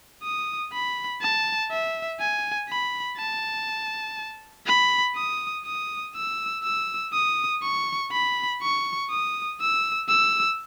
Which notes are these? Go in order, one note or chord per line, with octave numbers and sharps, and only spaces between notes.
D#6
B5
A5
E5
G#5
B5
A5
B5
D#6
D#6
E6
E6
D#6
C#6
B5
C#6
D#6
E6
E6